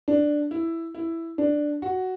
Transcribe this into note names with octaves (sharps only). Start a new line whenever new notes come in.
D4
E4
E4
D4
F#4